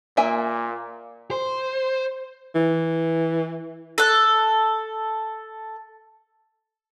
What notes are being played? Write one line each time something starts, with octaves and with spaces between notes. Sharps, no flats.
A#2 A#3 E5 G#5
C5
E3
A4 F#6